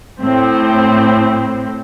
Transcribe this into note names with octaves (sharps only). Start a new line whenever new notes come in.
A2 C4